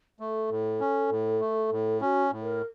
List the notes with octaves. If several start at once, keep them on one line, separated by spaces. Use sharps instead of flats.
A3 A4
A2
C#4
A2
A3
A2
C#4 F#4
A2
A#4